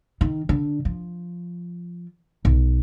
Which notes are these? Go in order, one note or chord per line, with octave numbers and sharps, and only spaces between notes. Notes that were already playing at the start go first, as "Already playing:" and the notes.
D#3
D3
F3
B1